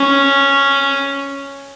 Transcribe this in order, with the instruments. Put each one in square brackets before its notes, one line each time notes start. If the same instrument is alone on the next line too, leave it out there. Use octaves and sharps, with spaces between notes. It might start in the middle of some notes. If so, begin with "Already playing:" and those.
Already playing: [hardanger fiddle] C#4